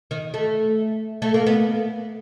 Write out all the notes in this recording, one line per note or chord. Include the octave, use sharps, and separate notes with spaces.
D#3
A3
A3
A#3
B3